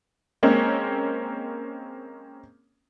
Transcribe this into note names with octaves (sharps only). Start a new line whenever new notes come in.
G#3 A#3 C4 C#4